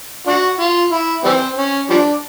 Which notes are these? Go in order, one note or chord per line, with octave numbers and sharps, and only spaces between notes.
D4 F#4
F4
E4
E3 G3 C4
C#4
F3 G3 D4